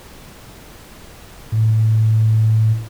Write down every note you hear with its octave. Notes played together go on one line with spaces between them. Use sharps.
A2